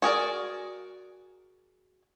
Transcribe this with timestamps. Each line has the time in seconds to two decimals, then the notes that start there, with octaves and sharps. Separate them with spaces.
0.02 F#4 G#4 A#4 D5